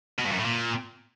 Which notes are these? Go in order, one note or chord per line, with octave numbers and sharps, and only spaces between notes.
B2
G2
F#2
A2
A#2